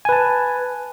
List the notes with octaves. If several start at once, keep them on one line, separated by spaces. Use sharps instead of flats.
B4 G#5 A5